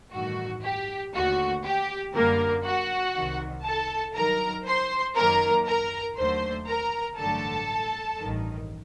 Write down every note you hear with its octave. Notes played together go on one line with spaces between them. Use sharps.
A1 G2 D#3 A3 F#4
G4
D#2 D3 A3 F#4
G4
F#2 D3 G3 A#3 A#4
F#4 F#5
C2 C3 D#3
A4 A5
G2 D#3 F#3 A#4 A#5
C5 C6
F#2 D#3 F#3 A#3 A#4 A#5
A#4 A#5
D#2 D3 F#3 A3 C5 C6
A#4 A#5
A1 G2 D3 F#3 A3 A4 A5
A1 G2 D#3